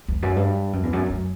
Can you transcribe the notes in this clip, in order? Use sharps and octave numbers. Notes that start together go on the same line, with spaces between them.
E2
F#2
G2
F#2
E2
F#2
F#2